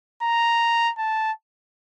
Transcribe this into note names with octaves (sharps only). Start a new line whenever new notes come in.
A#5
A5